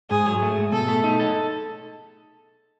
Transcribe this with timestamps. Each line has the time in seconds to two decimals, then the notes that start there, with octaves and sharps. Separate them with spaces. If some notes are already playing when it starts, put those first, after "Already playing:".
0.10 G#2 G#4
0.26 F#3
0.42 A3
0.57 G#2
0.72 B2 A4
0.88 A3
1.04 D#4
1.19 A4